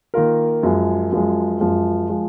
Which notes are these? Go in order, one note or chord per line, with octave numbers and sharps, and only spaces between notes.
D#3 A#3 F4 A#4
F#2 F3 G#3
F#2 F3 G#3
F#2 F3 G#3
F3 G#3